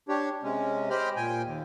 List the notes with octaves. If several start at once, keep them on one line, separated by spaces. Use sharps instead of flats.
D4 G4 C#5
C3 G#3 C#4
G4 C5 D#5 G5 B5 F6
A#2 G5 G#5
D#2